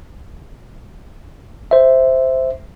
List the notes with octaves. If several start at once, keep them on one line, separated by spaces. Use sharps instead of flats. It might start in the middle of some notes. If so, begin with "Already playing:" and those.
C5 E5